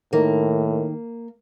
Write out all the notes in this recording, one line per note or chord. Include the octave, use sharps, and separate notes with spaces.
A2 D#3 A#3